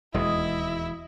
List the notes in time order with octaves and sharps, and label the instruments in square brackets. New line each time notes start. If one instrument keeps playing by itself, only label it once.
[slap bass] E1 D#2 G#3 [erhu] E4 [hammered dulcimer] D#5